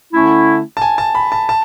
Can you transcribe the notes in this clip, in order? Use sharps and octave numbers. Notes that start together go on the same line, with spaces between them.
D3 A3 C#4 E4
A5
G#5
A5
B5
A5
A5